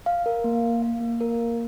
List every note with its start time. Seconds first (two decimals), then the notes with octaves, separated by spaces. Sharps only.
0.06 F5
0.26 A#4
0.44 A#3
0.63 F5
0.82 F5
1.00 A#3
1.21 A#4
1.38 A#3